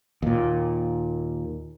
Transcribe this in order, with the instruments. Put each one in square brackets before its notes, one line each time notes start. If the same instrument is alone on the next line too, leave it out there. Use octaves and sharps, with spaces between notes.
[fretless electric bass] D#2 A#2